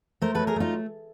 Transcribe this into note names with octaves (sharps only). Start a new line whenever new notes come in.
A3 A#4 C5
F#3 A4 B4
G#4 A#4
A3 D#4 F4